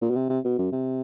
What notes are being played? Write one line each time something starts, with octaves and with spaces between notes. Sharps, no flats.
A#2
B2
C3
C3
B2
F#2
C3